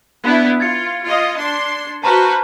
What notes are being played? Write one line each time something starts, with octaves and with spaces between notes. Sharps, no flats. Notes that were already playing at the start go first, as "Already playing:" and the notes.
B3 D4 E4
F4 G#6 A6 C#7
F4 D#5
D4 C6
F#4 B4 C5 A5 A#5 F6